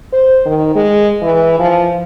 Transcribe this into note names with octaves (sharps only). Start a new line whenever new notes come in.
C5
D#3
G#3
E3
F3